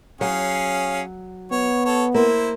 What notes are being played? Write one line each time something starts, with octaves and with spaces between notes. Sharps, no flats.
F#3 C#4 G#4 F5
B3 C#5
A4 C#5
A#3 E4 C5